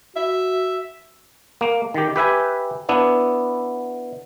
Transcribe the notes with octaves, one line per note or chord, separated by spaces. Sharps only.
F#4 E5
A#3
D#3 G4
G4 B4 E5 G#5
B3 D4 E4